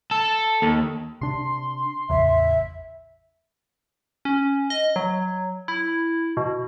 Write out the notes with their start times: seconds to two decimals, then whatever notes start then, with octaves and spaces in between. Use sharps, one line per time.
0.11 A4
0.62 D#2
1.21 C3 D4 C6
2.10 A1 E2 C#3 E5
4.25 C#4
4.70 D#5
4.96 F#3
5.68 E4
6.37 B2